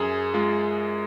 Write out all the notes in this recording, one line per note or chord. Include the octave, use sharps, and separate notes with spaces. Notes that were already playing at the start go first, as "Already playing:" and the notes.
Already playing: F#2 G#4
G#3 F4